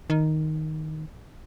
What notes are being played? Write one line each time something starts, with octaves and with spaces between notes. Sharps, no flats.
D#3